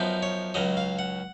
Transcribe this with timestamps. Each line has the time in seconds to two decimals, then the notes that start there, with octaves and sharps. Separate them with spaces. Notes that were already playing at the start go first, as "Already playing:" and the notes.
Already playing: F#2 F3 B3 D#4
0.23 C#5
0.54 C#2 C#3 F#3 D#5
0.77 F5
0.99 F#5